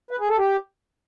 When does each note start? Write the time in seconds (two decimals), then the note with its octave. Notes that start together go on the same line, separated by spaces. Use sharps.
0.11 B4
0.20 G#4
0.29 A4
0.38 G4